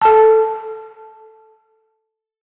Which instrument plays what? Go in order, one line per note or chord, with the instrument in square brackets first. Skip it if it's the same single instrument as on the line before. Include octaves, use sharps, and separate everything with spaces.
[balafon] A4 A5